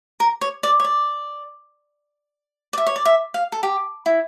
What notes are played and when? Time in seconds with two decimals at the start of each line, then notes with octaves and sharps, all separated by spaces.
0.20 A#4
0.41 C#5
0.63 D5
0.80 C#5
0.84 D5
2.73 D5
2.78 E5
2.87 C#5
2.96 D5
3.05 E5
3.34 F5
3.52 A4
3.63 G4
4.06 E4